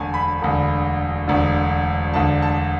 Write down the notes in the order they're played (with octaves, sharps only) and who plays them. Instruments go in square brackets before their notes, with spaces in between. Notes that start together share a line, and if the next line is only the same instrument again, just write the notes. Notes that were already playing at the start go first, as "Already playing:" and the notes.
Already playing: [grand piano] E1 D2 D3 G#5 A5
B5
E1 D2 D3
E1 D2 D3
E1 D2 D3 A5
A5